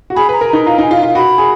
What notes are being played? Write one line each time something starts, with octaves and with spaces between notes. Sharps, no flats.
F#4
G#4 B5
B4
A#5
A#4
D#4 A#5
F4 A#5
D#4
G#5
F4
F4
F#4 B5
G#4